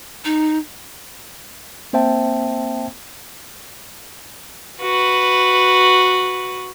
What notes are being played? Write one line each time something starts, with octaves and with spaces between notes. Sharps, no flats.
D#4
A#3 C4 C5 E5 G5 A5
F#4 B4